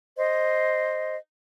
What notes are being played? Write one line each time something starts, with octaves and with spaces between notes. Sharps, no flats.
C5 D#5